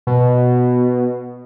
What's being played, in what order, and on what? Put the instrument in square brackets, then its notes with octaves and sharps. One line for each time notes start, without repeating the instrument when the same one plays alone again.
[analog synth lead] B2